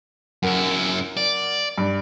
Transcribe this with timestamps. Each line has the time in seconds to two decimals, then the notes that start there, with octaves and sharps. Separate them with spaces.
0.43 F#2 E4 A#4 F#5
1.17 D5
1.78 G2